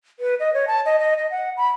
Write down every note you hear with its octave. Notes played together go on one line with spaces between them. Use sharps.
B4
D#5
C#5
A5
D#5
D#5
D#5
F#5
B5